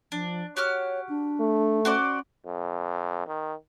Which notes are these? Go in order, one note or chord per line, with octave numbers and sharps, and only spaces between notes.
F3 D4
F#4 G4 C#5 F6
D4
A3
C#4 F#4 C5 D5
F2
D#3